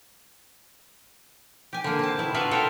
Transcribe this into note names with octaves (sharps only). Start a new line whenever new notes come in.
G4 G#5
D3 A#3
C4 A5
B2 E4
D4 F4 F#4 B4 E5 F5
A4 A#4 C#5 F5 G5